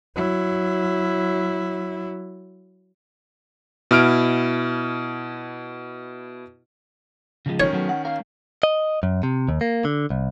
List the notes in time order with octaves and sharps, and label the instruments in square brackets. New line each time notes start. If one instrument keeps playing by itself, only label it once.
[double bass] F#3 E4
[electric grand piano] B2 E4 F6 D7
[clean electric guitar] C#3 F3 G#3
[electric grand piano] D#3 C#4 [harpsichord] C#5
[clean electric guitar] F#3 A3 B3
F#5
A#4 F5
D#5
F#2
C3
D#2
A#3
D3
C2